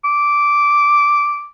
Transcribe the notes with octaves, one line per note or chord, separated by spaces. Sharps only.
D6